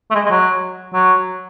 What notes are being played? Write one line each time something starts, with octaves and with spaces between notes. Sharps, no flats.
A3
G#3
G#3
F#3
F#3